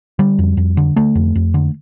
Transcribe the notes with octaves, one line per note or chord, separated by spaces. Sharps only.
D3 G3
F2
F2
D3
D3 A3
F2
F2
D3